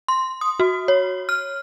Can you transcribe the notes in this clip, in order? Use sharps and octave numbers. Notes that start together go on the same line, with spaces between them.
C6
D#6
F#4
C#5
F6